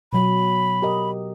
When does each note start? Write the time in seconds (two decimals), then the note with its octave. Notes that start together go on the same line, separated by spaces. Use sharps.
0.13 B2 F#3 B5
0.82 G4 A#4 D#5